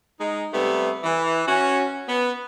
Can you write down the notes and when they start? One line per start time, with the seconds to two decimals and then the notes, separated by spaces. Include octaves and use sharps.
0.19 G#3 D#4
0.51 C3 G3 A3 B3
1.03 E3
1.47 C#4 F#4
2.08 B3